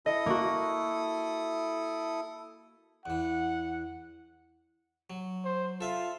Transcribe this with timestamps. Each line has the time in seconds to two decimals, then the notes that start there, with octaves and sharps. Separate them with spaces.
0.06 E4 A4 D#5 D#6
0.26 A#3 F#4
3.06 E2 E3 F#5
5.10 F#3
5.45 C5
5.81 F4 A4 E5 F5